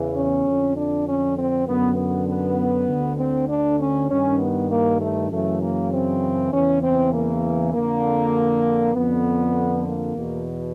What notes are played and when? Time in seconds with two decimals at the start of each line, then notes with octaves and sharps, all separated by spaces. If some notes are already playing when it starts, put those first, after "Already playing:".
Already playing: E2 C#3 E3
0.15 C#4
0.46 F2 D3
0.75 D4
1.06 C#4
1.36 C4
1.66 F#2 D3 B3
1.97 B3
2.27 B3
2.88 D2 D3
3.18 C4
3.49 D4
3.79 C#4
4.09 G2 D#3 C#4
4.39 B3
4.70 A#3
5.00 A3
5.30 F#2 C#3 E3 A3
5.60 A#3
5.91 C4
6.52 E2 C#3 E3 C#4
6.81 C4
7.12 A#3
7.72 F2 D3 A#3
8.95 F2 D3 B3
9.85 A#3
10.15 E2 B2